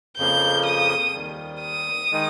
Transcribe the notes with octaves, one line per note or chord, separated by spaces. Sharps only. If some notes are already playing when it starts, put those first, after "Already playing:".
F2 C#3 F3 A#3 G6
D#6
D#2 D#3 G3
D#6
D#3 G#3 D#4